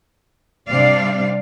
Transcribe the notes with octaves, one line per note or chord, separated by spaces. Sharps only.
C3 G3 C4 D4 D5 F5